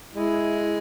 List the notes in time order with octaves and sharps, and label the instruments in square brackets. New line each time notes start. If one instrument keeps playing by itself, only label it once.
[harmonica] G#3 [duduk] E4